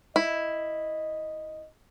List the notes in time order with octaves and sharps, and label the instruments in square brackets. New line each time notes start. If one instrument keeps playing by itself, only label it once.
[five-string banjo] E4 [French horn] D#5